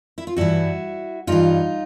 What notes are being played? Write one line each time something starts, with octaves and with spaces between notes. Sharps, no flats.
E4
F4
G2 E3 E4 F#4
G2 E3 D#4 F4